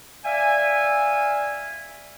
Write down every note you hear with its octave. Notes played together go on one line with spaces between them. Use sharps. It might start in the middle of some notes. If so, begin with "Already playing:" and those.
D5 E5 F5 G#5